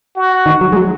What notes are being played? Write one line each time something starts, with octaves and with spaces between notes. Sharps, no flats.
F#4
D#3
F#3
G#3
F#3